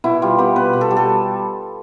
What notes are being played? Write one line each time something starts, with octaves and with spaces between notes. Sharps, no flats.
B2 E4
G3 F4
B3 G4
B2 B4
B2
A4
G3
A4